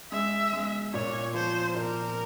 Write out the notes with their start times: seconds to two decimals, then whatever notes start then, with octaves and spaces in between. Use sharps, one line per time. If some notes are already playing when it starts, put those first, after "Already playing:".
0.12 G#3 E5
0.53 G#3
0.93 A#2 C#5
1.34 F3 C5
1.75 A#2 A#4